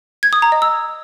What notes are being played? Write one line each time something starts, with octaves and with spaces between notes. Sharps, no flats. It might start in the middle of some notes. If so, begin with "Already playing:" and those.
G#6
D#6
A#5
D#5
E6